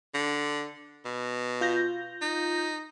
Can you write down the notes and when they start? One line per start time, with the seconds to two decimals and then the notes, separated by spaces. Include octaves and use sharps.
0.14 D3
1.05 B2
1.61 F4 G6 A#6
2.22 D#4